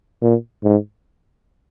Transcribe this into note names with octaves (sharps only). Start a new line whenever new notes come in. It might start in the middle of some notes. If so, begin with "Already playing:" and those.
A#2
G#2